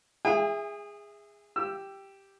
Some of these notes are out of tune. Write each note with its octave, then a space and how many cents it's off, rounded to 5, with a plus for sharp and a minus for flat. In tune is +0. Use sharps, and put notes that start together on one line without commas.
G#4 -15 E5 +0 G#5 -45
G4 +0 E6 +20